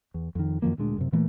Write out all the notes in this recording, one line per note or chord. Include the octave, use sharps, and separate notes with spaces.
E2
F2 D#3
F#2 D#3 F3 A#3
D2 A#2 G#3 D4
F#2 C3
A#2 E3 A3 A#3